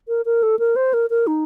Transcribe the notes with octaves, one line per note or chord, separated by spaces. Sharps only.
A#4
A#4
A4
A#4
C5
A#4
A#4
D#4